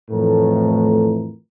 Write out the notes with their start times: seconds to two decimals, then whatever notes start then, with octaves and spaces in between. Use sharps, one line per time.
0.11 F2 A2 E3 A3 A#4